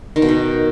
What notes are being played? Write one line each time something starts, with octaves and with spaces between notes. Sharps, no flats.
D#3
B2
D#3